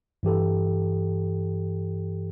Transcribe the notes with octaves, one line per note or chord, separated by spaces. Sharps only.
G2 E3 G4 A4